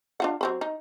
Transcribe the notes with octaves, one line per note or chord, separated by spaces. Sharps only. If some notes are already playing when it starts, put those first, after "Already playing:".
D4 F4 F#5
F#3 C4 B5
D#4